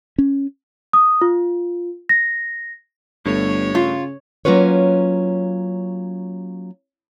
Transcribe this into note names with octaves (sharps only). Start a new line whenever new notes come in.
C#4
D#6
F4
A#6
G1 G2 A3 C#5
C#3 F4
F#3 A#3 C#4 F4 B4 C#5